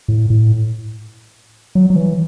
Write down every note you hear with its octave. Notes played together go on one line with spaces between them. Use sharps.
A2
A2
F#3
F#3
E3